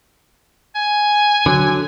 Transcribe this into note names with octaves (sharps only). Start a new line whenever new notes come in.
G#5
D3 F#3